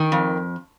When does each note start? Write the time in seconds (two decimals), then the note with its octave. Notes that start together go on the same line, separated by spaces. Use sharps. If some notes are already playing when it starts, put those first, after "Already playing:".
Already playing: D#3
0.12 F2